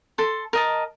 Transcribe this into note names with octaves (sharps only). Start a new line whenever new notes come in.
A4 C6
A#4 D#5 A5